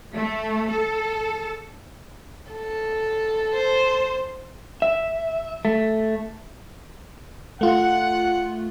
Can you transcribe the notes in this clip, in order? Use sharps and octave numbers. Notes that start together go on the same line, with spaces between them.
A3
A4
A4
C5
E5
A3
A3 F4 F#5